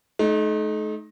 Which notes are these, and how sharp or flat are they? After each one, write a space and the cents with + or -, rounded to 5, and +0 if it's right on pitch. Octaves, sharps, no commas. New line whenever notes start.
A3 -40 D#4 +0